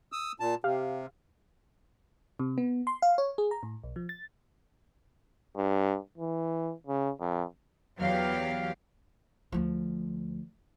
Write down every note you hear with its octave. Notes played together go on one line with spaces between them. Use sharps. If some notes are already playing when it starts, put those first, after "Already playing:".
D#6 E6
A#2 A5
C3 G4 F5
C3
B3
C6
F5
C#5
G#4
A#5
A2
B1
F3
A6
G2
E3
C#3
F2
E2 F#3 B3 G4 F5
D2 F3